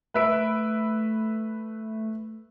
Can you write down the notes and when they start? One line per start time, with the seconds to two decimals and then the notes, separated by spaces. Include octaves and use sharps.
0.14 A3 B4 E5 D7